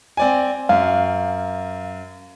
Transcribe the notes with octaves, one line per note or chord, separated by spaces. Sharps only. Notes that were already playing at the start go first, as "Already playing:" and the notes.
C4 D5 G#5
F#2 F5